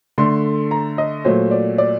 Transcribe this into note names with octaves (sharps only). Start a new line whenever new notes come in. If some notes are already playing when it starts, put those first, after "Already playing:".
D3 A3 C6
A#5
D#5
A#2 F#3 A3 C5
D5
D5